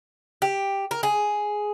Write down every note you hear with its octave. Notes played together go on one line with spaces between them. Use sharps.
G4
A#4
G#4